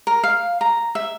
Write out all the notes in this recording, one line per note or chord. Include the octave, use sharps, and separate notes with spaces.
A#4
F5
A#5
E5